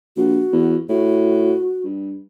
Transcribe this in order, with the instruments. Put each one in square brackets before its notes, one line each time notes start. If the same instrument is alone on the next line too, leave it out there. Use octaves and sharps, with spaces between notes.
[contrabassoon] A#1 [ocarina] F#4
[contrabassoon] E2
[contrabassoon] A2 [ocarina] F#4
[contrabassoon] G2